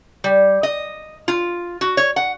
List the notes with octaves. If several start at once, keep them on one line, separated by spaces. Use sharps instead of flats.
G3
D#5
F4
F#4
C#5
F#5